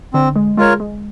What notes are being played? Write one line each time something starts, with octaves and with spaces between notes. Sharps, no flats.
D3 C4
G#3
G#3 F4 A#4 C#5
G#3